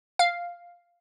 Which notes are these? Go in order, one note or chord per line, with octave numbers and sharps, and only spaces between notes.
F5